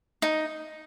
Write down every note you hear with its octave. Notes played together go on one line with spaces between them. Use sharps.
D#4